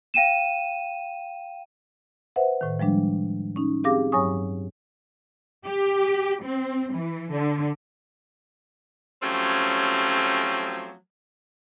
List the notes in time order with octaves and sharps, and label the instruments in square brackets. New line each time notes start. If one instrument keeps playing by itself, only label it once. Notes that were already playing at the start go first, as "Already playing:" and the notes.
[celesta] F5 G5 D#7 E7
[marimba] B4 C5 E5 F#5
A2 D#3
F3 G3 G#3 D4
C#4 D#4
C4 G4 G#4 F5 D6 A#6
G2 F#3 C#5 G#5 C#6 D#6
[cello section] G4
C4
E3
D3
[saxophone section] F3 F#3 A3 C4 C#4 G4